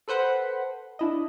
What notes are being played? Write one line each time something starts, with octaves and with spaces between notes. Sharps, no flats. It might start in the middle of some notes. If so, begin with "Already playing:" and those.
A4 B4 C5 F#5 B5
D4 E4 D#5